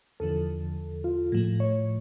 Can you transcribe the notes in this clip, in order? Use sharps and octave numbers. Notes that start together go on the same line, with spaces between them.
E2 D3 F3 A4
F4
A2 F3 A3
C#5